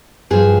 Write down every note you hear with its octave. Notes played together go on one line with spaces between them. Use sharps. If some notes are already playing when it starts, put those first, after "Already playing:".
G2 F3 G#4